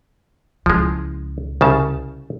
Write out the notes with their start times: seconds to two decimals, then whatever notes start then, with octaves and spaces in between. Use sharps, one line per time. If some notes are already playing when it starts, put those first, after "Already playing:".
0.66 C#2 F3 G#3 E4
1.61 C2 C#3 A5